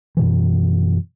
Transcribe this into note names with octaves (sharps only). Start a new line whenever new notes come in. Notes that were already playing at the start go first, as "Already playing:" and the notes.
F#2 B2 E3